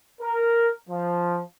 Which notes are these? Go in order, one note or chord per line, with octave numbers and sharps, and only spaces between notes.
A#4
F3